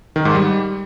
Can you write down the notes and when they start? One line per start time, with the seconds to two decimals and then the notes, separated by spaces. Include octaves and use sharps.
0.16 D#3
0.25 G#2
0.35 G3